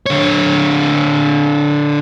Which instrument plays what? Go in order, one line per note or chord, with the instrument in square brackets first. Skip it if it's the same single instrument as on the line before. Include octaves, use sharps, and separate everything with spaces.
[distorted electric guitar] D3 C#5